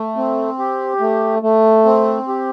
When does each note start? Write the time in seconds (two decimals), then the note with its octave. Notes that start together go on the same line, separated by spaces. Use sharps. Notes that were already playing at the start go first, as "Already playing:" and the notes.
Already playing: A3
0.16 C4
0.59 G4
1.00 A3
1.42 A3
1.85 C4
2.28 G4